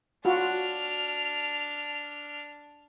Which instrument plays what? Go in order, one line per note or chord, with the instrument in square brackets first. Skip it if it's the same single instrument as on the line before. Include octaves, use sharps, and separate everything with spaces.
[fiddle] D4 F6 [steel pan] F4 F#4